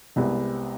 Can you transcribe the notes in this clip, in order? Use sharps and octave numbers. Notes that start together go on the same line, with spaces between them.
C2 C3 G#3 B3